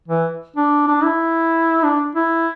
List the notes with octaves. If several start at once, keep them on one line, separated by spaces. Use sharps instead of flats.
E3
D4
D4
E4
D4
E4